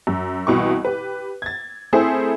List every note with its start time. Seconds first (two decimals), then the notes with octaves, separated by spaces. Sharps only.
0.07 F#2
0.47 C2 B2 E3 C#6
0.85 G4 B4
1.42 G#6 A6
1.93 A3 C4 E4 G#4 A4 C5